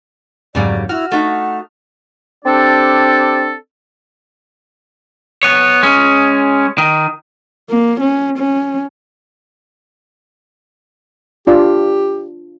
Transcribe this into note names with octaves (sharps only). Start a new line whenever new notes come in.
F2 G#2 C#3 F#3 G3 A#3 D5
E4 F#4 F6
A3 D#4 F#4 F#5
C4 D4 G4 A4 D5
B3 C#5
G#3 C#4
D#3
A#3
C#4
C#4
D4 F4 G4 D5